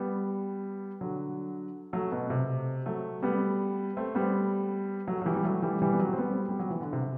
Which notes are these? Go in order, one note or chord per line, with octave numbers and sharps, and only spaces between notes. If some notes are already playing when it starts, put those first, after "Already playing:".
Already playing: G3 B3
D3 F#3
F#3 A3
B2
C3
F#3 A3
G3 B3
A3 C4
G3 B3
F#3 A3
F#3
E3 G3
G3
F#3 A3
E3 G3
E3 G3
B3
F#3 A3
C4
G3 B3
G3
F#3
E3
D3
C3